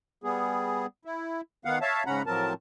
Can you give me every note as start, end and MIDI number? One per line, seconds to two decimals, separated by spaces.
0.24 0.86 55
0.24 0.86 59
0.24 0.86 68
1.05 1.41 64
1.65 1.79 51
1.65 1.79 59
1.65 1.79 77
1.65 1.79 78
1.82 2.03 73
1.82 2.03 76
1.82 2.03 77
1.82 2.03 81
2.06 2.22 44
2.06 2.22 49
2.06 2.22 61
2.06 2.22 78
2.06 2.22 82
2.06 2.22 83
2.26 2.53 45
2.26 2.53 53
2.26 2.53 54
2.26 2.53 60
2.26 2.53 70
2.26 2.53 81